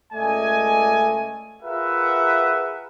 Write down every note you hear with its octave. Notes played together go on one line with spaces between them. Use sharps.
C#2 A3 D5 D#5 G#5
F4 G#4 A#4 B4 E5 F#5